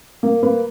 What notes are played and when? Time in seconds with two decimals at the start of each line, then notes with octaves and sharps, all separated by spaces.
0.23 A#3
0.43 A#3 B4